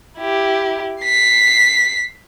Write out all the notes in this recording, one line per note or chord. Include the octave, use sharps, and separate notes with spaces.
E4 G4
B6 C7